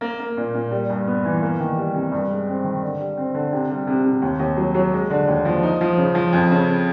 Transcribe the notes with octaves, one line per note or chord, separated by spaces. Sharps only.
A#3
A#3
A#2
A#2
G3
G2
B3
E3
A#3
D#3
G3
C3
G2
G#3
C4
D#3
D3
G3
C4
D3
C3
G3
C3
C3
D#2
D#2
F#3
F#3
G#3
D3
D#2
F3
D#4
F3
C#3
F3
F2
C#3